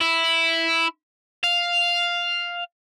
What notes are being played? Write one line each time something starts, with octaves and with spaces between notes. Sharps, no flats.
E4
F5